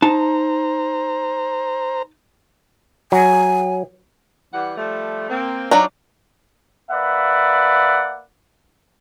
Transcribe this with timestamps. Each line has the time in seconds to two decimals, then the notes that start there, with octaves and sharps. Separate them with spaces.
0.02 D#4 C5 A5 A#5
3.12 F#3 G#5
4.52 E3 G3 F#5
4.76 F3 G3 A3
5.29 A#3 C4
5.71 F3 F#3 D4 D#4 A#5
6.90 A#3 B4 D5 E5 F#5